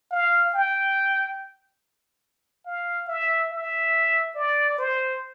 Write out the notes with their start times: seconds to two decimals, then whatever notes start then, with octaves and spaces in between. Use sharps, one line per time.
0.11 F5
0.54 G5
2.66 F5
3.08 E5
3.51 E5
4.36 D5
4.78 C5